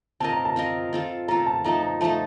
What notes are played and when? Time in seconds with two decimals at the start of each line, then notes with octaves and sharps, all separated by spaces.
0.20 C4 F4 A#4 D#5 A5
0.32 A#5
0.45 A5
0.56 C4 F4 A#4 D#5
0.93 C4 F4 A4
1.28 C4 F4 A4 A#5
1.47 A5
1.64 F3 A3 D#4 A4 A#5
1.83 A#5
2.01 F3 A3 D#4 A4 A5